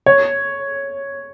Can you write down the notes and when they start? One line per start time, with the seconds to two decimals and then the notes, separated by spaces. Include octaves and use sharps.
0.06 C#5